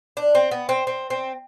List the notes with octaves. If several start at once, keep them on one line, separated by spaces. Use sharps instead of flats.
D4
C4
B3
C4
C4
C4